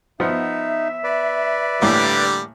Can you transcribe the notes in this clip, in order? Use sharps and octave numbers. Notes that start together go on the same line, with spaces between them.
F3 B3 D#4 E5 F#5
B4 D5
A2 D3 E3 G3 A#3 D6